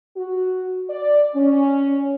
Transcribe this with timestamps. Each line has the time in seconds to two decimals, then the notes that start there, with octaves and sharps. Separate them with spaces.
0.16 F#4
0.90 D5
1.35 C#4